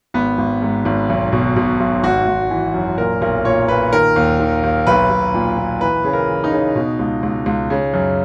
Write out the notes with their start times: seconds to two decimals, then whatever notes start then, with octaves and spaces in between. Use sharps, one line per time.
0.14 G#1 B3
0.38 G#1
0.62 G#2
0.85 G#1
1.09 B1
1.32 B2
1.56 B2
1.80 B1
2.04 G#1 F#4
2.27 G#1
2.50 E3
2.74 F#2
2.98 A#2 A#4
3.21 B1 A#4
3.45 A#2 C#5
3.68 A#2 B4
3.92 D#3 A#4
4.16 D#2
4.40 D#3
4.63 D#2
4.87 B1 B4
5.10 B1
5.34 A#2
5.58 A#2
5.81 E3 B4
6.04 C#3
6.13 A#4
6.29 E3
6.44 D#4
6.52 C#3
6.76 B2
6.99 C#2
7.23 C#2
7.46 C#2
7.70 C#3
7.94 F#2